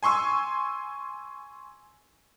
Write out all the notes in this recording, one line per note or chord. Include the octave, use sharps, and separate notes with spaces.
G#5 C6 C#6 E6